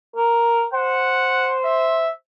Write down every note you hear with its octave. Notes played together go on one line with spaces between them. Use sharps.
A#4
C5 F#5
E5